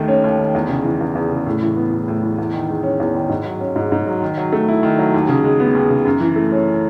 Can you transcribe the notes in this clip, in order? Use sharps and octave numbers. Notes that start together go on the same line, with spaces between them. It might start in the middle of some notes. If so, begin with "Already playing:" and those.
Already playing: D#2 D#3 A3
C#4
D#2
D#3
E2
C#3
E3
E2
E2
C#3
A2
E3
B3
A2
A2
E3
E2
D#3
G#3
C#4
E2
D#3
G#2
F#3
C#4
G#2
G#2
F#3
D#3
F#3
A3
E4
D#3
F#3
D#2
C#3
G#3
B3
D#2
C#3
F#2
E3
A3
C#4